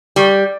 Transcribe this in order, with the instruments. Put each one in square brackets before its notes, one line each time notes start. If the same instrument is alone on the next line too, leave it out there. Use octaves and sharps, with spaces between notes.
[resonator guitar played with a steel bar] G3